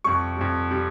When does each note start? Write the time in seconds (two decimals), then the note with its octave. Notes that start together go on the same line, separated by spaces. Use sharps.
0.04 F2 C3 G3 C#6
0.37 F2 C3 G3
0.71 C3 G3